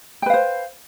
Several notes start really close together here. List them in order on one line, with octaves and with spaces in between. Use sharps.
G5 B4 F5 C5